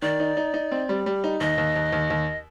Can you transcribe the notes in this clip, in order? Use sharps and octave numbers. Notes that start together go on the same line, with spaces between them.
D#3 D5
D#4
D#4
D#4
C4
G3
G3
D#4
D#2 D#5
D#2
D#2
D#2
D#2